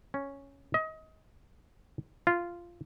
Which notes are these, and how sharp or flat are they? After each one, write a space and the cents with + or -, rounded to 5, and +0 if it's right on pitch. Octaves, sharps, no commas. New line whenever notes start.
C#4 +0
D#5 +25
F4 -10